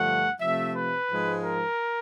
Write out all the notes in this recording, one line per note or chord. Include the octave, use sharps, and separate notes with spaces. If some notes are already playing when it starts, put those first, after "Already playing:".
Already playing: G2 D3 F3 A3 F#5
C3 F3 A3 E5
B4
G#2 F3 G#3
A#4